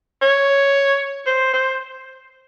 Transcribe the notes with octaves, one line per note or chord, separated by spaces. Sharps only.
C#5
C5
C5